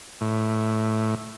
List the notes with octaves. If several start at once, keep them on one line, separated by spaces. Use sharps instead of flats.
A2